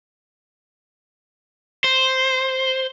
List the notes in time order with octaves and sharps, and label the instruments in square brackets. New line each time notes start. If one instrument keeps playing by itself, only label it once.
[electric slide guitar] C5